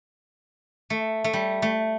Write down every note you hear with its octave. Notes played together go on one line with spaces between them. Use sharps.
A3
A3
G3
A3